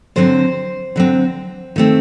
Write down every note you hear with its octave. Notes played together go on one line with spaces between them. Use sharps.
D3 F#3 C4 C5
D3 F#3 C4
D#3 A3 C4